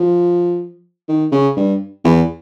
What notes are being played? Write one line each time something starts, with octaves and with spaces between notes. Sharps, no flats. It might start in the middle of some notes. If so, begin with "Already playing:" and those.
Already playing: F3
D#3
C#3
G2
E2